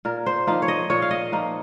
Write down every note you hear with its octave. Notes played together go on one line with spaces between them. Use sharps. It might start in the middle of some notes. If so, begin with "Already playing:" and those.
A#2 A#4
C5
F3 A#3 D#4 F5
C#5
D#5
A#2 C#5
F5
D#5
F3 A#3 D#4